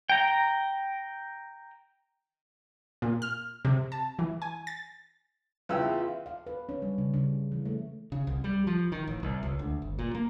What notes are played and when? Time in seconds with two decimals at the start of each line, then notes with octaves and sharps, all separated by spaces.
0.09 G5 A#5
3.02 A#2
3.22 F6
3.65 C3
3.92 A5
4.19 E3
4.42 G#5
4.67 A6
5.69 E2 C#3 F4 B4 E5 G5 E6
6.26 F5
6.47 B4
6.69 C#4
6.82 G3
6.98 C#3
7.14 C#3
7.52 E3
7.66 A3
8.12 C#3
8.27 C2
8.44 G3
8.67 F3
8.92 D#3
9.07 A1
9.23 C2
9.43 C#2
9.59 D2
9.82 G1
9.99 A#2
10.15 A#3